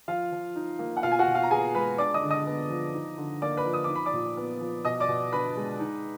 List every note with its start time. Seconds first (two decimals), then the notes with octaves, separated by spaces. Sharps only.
0.08 F3 F4 F5
0.32 F3
0.56 D#4
0.79 A#3
0.97 F#5
1.03 B2 F4 F5
1.12 G#5
1.19 F#4 F#5
1.27 B2
1.35 F4 F5
1.43 A#5
1.51 B3 G#4 G#5
1.74 G#3 B4 B5
1.98 D4 D5 D6
2.14 D#5 D#6
2.23 D3
2.30 D#5 D#6
2.46 B3
2.70 F3
2.94 D#4
3.18 D3
3.42 A#3 D5 D6
3.57 B4 B5
3.66 F3
3.74 D#6
3.84 D#4 D6
3.96 B5
4.06 D5 D6
4.13 A#2
4.37 B3
4.61 F3
4.85 B2 D#5 D#6
5.00 D5 D6
5.08 B2
5.32 D4 B4 B5
5.56 G#3
5.80 D#4